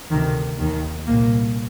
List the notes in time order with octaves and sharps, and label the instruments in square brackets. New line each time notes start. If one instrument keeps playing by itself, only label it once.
[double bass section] D2 C3 D#3
D#2 D#3
C2 A#2 A#3